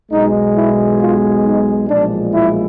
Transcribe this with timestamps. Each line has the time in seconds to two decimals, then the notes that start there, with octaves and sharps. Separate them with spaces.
0.11 B1 B2 G#3 D#4
0.56 E4
1.00 F4
1.45 D#4
1.89 B1 A#2 F3 G#3 D4
2.33 E4